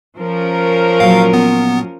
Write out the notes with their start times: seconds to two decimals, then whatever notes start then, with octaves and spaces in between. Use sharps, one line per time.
0.17 F3 C#4 A#4
1.00 A#2 F#3 F5
1.33 B3